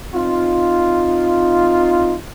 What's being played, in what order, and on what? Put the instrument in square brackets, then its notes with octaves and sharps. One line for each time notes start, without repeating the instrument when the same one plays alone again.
[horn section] C4 D#4 F4